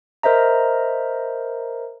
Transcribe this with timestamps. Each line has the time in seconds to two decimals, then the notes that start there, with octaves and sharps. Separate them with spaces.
0.23 A#4 C5 D#5 E5 A#5